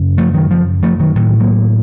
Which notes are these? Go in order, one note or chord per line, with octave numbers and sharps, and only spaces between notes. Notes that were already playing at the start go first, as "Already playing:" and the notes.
Already playing: F#2 C#3
F3 A3
D#3 F#3
F3
F3 A3
D#3 F#3
A2 D#3 F#3
F#3 A#3